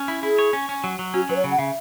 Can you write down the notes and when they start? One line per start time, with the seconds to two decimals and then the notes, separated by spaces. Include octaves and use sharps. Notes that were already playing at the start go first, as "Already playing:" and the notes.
Already playing: C#4
0.08 E4
0.22 E4 G#4
0.39 C#5
0.53 C#4
0.69 C#4
0.84 F#3
0.99 F#3
1.14 C#4 F#4
1.29 F#3 B4
1.36 C#5
1.44 C#3
1.51 F#5
1.59 C#3 E5